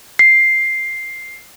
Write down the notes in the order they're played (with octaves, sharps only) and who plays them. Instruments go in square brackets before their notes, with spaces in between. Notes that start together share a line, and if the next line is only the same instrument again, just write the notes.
[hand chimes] C7